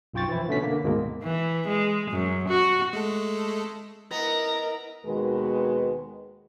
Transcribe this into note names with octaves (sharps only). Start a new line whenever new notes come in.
B1 F#2 F4 G5 C#6 A6
E3 F3 E4
B2 D3 A3 C#4 B6
D3 A#3
D2 G#2 B2 D#3 G#3 A#3
E3
G#3
F#2
F#4
G#3 A3 A4
B3 E4 A#4 D#5 A#5
D#2 B2 D#3 G#3 F#4 B4